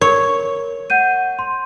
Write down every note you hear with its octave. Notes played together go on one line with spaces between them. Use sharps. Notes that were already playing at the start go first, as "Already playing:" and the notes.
A#4 C#5
F#5 G6 D#7
C6